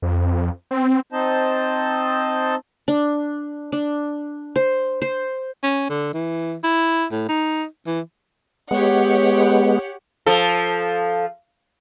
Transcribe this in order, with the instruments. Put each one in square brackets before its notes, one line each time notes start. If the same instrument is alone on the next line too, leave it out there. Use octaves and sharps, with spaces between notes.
[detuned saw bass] F2
C4
[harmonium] C4 D#4 C5 D#5 A5
[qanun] D4
D4
C5
C5
[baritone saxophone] C#4
D3
E3
E4
A2
D#4
E3
[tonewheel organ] G#3 B3 [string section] G4 C#5 F#5
[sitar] F3 A4